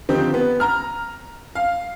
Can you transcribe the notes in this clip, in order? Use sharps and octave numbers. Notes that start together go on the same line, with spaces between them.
D3 D#3 F3 C4 D#4 G4
B3
A#5 F6
F5